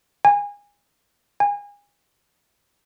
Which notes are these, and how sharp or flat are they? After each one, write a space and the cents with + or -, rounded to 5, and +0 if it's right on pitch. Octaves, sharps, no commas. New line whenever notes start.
G#5 -25
G#5 -30